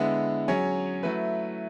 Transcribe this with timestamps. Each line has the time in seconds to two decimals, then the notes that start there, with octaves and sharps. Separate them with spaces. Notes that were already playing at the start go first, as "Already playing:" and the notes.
Already playing: D3 G#3 B3 E4
0.48 F#3 C#4 G#4 C#5
1.03 F#3 A3 E4 B4